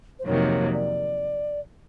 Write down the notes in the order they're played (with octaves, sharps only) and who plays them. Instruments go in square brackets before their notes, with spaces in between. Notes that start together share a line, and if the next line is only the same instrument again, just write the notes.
[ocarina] C5
[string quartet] F2 C3 D#3 F#3 A#3 [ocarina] C#5
[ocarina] D5